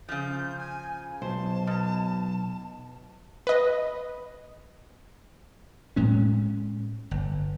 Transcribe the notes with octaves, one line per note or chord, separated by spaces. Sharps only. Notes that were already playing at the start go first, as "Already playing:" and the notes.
C#3 F3 G6
G#5
B1 C5 A5
B2
B4 D#5
A2 G#3 C#4
G1